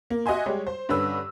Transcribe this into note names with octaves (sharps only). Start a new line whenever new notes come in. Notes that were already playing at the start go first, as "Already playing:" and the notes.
A#3
F#4 D#5 E5 G#5 C6
G3 G#3 G4 C#5
C5
G2 D3 C#4 B4 E6